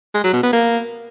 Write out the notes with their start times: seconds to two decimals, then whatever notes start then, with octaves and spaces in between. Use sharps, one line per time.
0.14 G#3
0.24 F#3
0.33 B2
0.43 B3
0.53 A#3